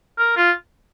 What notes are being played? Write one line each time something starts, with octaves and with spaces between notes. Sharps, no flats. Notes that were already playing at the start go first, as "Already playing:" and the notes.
A#4
F4